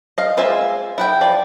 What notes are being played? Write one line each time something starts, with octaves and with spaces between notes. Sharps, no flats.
D#5 F5
G#3 F4 C5 E5 G#5
E4 F#5 G5
F3 D5